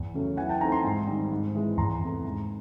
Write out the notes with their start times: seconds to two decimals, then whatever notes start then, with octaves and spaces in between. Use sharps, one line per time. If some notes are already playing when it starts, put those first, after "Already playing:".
Already playing: E2
0.14 C#3 F#3 A3 C#4
0.37 E3 F#5 G#5
0.49 G5 A5
0.61 A3 C4 D#4 G#5 A#5
0.72 A#5 C6
0.84 G#2
1.07 D#3 G3 C4
1.31 G#2
1.55 E3 G#3
1.77 E2 A#5 C6
2.01 C3 E3 A3
2.25 G#2